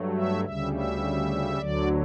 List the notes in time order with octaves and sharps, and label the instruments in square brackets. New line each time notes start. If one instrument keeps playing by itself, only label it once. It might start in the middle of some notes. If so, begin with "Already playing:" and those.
Already playing: [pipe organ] G2 F#3 A3
E5
D2 C#3 G3 E5
E5
D2 D3 F#3 D5